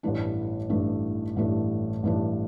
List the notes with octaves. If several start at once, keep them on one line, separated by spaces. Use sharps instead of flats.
A1 G2 E3 A3 D4
A1 G2 E3 A3 D4
A1 G2 E3 A3 D4
A1 G2 E3 A3 D4